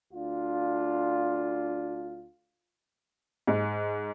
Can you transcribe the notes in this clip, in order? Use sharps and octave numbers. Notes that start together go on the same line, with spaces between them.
D2 D4 F4
G#2